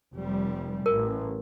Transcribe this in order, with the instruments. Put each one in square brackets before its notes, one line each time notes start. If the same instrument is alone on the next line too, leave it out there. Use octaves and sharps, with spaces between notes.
[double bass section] F1 G3
[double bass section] A1 [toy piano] A#4